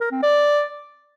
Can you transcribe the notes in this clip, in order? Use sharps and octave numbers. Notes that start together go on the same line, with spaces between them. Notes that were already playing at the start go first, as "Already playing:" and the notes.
A#4
C4
D5